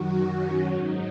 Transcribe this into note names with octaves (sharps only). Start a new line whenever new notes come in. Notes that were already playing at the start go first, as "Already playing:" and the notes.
Already playing: F#2 D#3 F#3 F#4
C#4
G#2 F#3 D#4